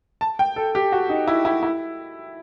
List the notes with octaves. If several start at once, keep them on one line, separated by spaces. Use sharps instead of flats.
A5
G5
A4
G4
F#4
D#4
E4
E4
E4